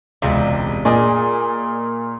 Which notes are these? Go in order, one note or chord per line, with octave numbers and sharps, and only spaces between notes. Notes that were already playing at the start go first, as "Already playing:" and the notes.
E1 C#2 C3 G3
A#2 G#4 D5 D#5 D#6